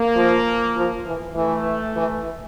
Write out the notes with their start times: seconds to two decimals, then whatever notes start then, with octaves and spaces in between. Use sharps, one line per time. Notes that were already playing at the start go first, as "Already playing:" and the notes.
Already playing: A#3
0.16 F3
0.76 F3
1.06 E3
1.36 E3 A3
1.96 E3